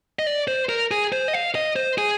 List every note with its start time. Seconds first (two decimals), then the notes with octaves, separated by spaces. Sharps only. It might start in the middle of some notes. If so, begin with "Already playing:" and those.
0.19 D#5
0.27 D5
0.48 C5
0.69 A#4
0.91 G#4
1.12 C5
1.28 D#5
1.34 F5
1.55 D#5
1.76 C5
1.98 G#4